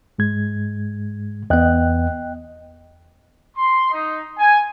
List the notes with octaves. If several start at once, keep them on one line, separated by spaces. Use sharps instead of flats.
G#2 G#3 G#6
E2 B3 D#5 G5 F#6
C6
D#4
G#5